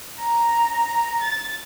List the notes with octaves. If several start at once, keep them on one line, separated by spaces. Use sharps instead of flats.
A#5
A6